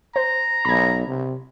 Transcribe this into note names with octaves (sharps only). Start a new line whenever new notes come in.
C5 A#5
B1 B5 G#6
C3